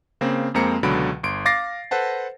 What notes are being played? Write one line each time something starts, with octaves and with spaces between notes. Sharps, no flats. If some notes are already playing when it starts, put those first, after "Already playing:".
C#3 A#3 C4
F2 G#3 A#3 C4 A#5 C#7
C#2 B2 D3 F#3 B5 D7
G1 C6 D7
F5 D6 A6 A#6 C7
A4 B4 C5 F#5 A5